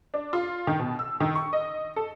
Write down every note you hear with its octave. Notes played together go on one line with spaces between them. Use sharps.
D4
F4
D#3
B2
E6
D#3
C#6
D#5
A4